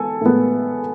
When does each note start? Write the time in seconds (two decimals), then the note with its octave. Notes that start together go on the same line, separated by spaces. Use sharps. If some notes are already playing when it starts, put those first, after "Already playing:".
Already playing: G#3 B3 A4 G#5
0.21 A2 G#3 B3